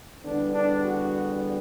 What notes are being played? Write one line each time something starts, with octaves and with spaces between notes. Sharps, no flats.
E2 D3 G3 B3 D4
D4
F#4